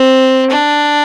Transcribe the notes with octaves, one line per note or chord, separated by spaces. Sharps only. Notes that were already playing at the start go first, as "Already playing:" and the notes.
Already playing: C4
D4